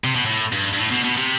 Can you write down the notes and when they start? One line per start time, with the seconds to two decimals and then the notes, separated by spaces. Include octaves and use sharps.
0.04 C3
0.16 B2
0.26 A2
0.53 G2
0.73 G2
0.79 A2
0.91 B2
1.05 B2
1.18 C3